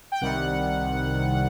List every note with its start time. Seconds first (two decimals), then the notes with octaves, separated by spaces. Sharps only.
0.12 G5
0.21 C2 C3 D#3 G3 F#5